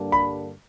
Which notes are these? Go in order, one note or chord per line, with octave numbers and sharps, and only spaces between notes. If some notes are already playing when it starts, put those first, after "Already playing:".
Already playing: G2 D3 G3 A#3 D4
B5